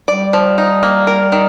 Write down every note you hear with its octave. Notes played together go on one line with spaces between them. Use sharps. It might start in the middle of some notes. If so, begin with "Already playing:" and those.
G3 D5
F3
D#4
A#3
A#4
D#3